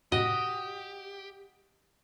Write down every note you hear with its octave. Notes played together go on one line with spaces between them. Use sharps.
F#2 A2 C3 F#4 G4 D#5